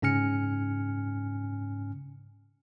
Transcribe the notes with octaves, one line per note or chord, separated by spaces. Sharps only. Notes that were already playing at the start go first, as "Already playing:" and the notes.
G#2 C#3 C#4 G#5 F6 C#7